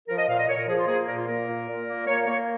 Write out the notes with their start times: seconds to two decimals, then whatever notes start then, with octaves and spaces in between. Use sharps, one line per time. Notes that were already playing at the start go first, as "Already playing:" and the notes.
0.08 F3 A#4
0.18 D#5
0.28 A#2 F5
0.38 D#5
0.48 A#2 C#5
0.58 A#4
0.68 F3 G#4
0.78 F4
0.88 A#3 G#4
1.07 A#2 A#4
1.18 F4
1.28 A#3 A#4
1.48 A#2
1.68 A#2
1.87 A#3
2.07 A#3 C#5
2.26 A#3 C#5